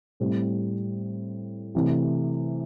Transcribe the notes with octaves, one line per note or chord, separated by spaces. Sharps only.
A2 G3 C4
C3 E3 A3